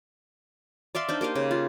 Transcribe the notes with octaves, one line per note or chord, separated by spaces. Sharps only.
D5 E5 F5 C6
D4 D#4 C5
A#3 G4 D#5 F5
C#3
F4